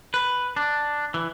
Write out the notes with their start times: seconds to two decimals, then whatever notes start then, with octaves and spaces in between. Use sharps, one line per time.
0.14 B4
0.56 D4
1.14 E3